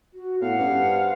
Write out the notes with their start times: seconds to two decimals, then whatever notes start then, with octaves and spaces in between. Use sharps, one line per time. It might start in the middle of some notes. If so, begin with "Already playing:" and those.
0.14 F#4
0.41 A2 B3 F5 F#5
0.59 G2 C#4
0.86 C5